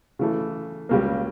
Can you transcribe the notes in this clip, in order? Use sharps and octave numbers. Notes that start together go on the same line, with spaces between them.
C#3 E3 A3
C#2 C#3 G3 A#3